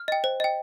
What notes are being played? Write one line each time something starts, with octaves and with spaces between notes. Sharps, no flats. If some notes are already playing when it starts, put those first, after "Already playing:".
Already playing: F6
D#5 G5
C5
D#5 G5